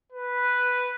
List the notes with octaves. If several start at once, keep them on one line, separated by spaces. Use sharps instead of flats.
B4